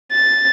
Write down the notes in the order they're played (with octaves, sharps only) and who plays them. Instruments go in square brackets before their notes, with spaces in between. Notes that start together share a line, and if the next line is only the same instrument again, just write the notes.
[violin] A6